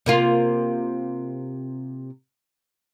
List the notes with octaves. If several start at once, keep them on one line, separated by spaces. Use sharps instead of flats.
C3 A#3 F4